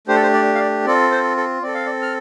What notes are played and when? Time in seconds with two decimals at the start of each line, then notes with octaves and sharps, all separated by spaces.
0.07 A3 D4 G4 C5
0.15 A4
0.22 C5
0.33 D5
0.55 F5
0.60 D5
0.85 C4 F4 A4 D5
1.11 C5
1.37 A4
1.62 C4 A4 D5
1.74 F5
1.86 D5
2.02 F6